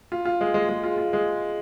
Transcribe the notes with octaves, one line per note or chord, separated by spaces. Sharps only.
F4
F4
G#3
G#3
G#3
F4
F4
G#3